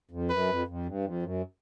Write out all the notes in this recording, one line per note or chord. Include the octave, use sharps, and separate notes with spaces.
F2
F#2 B4
F2
F2
G2
F2
F#2